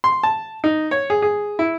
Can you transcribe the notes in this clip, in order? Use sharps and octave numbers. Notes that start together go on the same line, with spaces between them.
C6
A5
D#4
C#5
G#4
G#4
E4